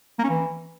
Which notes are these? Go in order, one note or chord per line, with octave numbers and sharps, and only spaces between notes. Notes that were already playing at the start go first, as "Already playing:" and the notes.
A#3
C#4
E3